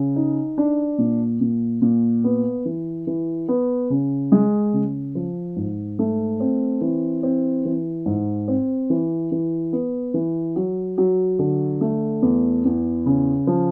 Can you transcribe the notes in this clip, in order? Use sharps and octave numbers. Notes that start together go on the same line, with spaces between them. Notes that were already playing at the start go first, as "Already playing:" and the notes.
Already playing: C#3
D#4
D4
A#2
A#2
A#2
B3
E3
E3
B3
C#3
G#3
C#3
F3
G#2
A3
C4
E3
C4
E3
G#2
C4
E3
E3
B3
E3
F#3
F#3
D3
A3
E2
E2
C#3
F3